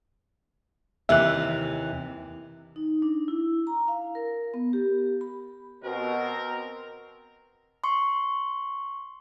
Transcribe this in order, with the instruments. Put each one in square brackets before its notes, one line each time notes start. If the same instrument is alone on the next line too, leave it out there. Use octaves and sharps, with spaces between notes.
[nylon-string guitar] D#2 C3 E3 [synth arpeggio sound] E5 F#6
[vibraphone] D#4
D4
E4
A#5
F5
A#4
B3
G4
B5
[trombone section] B2 [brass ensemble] C4 A#4
[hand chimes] C6 C#6